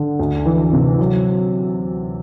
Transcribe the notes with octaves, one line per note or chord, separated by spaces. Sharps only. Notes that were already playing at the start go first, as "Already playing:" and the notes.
Already playing: D3
D2
E3
C3
F#3